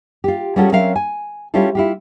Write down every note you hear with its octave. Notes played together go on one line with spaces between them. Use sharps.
F4 G4
G3 C#4 F4 F#4 G#4 A4
F#3 C4 C#4 A#4 E5 F5
G#5
G3 C#4 E4 F4 G4 A4
E4 F4 G4